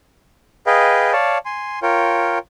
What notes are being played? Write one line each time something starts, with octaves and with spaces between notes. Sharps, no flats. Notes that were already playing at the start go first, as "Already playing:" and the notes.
G#4 B4 D#5 F5 G5
C#5 D5 F5 A5
G#5 C6
F4 A#4 C#5 G5